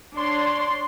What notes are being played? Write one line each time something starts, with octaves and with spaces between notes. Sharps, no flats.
D4 C#5 D5 C6